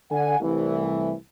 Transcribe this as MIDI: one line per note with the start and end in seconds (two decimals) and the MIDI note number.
0.11 0.38 50
0.11 0.38 78
0.11 0.38 80
0.41 1.13 36
0.41 1.13 52
0.41 1.13 57